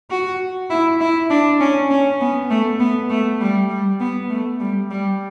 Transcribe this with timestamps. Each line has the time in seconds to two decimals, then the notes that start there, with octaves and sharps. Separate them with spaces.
0.11 F#4
0.71 E4
1.01 E4
1.31 D4
1.61 C#4
1.90 C#4
2.21 B3
2.50 A3
2.80 B3
3.10 A3
3.41 G3
3.70 G3
4.00 B3
4.30 A3
4.60 G3
4.91 G3